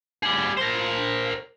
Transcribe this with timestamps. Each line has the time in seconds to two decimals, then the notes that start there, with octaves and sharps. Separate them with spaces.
0.23 G3 G#4
0.57 A#4 C5